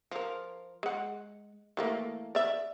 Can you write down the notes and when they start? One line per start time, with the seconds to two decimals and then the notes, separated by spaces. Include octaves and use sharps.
0.11 F3 A#4
0.83 G#3 F#5
1.77 E3 A3 A#3
2.35 D5 E5